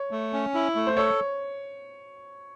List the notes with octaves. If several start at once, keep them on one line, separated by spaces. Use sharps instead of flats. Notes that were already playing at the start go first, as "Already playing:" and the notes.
Already playing: C#5
A3
C#4
E4
A3
C5
A4 C#5